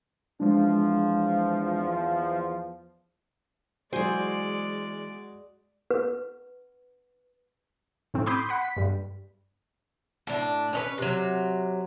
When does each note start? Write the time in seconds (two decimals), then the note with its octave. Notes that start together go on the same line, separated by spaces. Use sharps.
0.40 E2 F3 G#3 D4
3.93 E2 F#3 G#3 F#4 C5 D5 G#5
5.91 B4
8.14 A2 C4
8.26 B5 C6 D6 D#6 G6
8.49 F#5 B5
8.62 B6
8.77 G2 G3
10.27 A2 D4
10.73 C#4 D#4 B4
10.98 C3 F#3